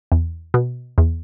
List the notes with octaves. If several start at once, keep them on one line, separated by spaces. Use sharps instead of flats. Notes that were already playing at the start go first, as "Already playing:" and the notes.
E2
B2
E2